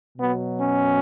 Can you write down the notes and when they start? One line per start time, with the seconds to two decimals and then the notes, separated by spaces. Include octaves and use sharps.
0.18 B2 F#3 B3
0.60 C#4